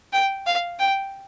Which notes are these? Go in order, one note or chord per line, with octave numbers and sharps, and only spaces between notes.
G5
F5
G5